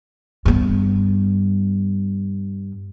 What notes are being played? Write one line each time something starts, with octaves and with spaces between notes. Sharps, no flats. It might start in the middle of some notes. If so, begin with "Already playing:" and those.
G2 B3